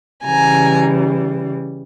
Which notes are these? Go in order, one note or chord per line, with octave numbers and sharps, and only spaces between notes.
C#3 E3 G3 G#5 A#5